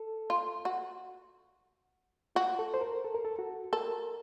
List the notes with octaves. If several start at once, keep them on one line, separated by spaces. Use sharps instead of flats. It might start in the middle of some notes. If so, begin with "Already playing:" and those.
Already playing: A4
F4
F#4
F4 F#4
A4
C5
A#4
A4
A#4
A4
F#4
A4 A#4